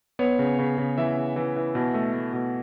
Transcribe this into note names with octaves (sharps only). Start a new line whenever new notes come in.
B3 C#5
C#3
C#3
C#3
E3 E5
C#3
E3
E3
B2
A3
A3
B2